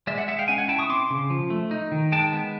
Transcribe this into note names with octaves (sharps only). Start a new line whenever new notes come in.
G#3 D5 E5
E5 F#5
G#3 E5 F#5
F5 G5
C#4 F#5 G#5
F#5 G#5
E4 G5 A5
C#6 D#6
C4 C6 D6
C#3
F3
A3
D#4
D#3
G#3 G5 A5
B3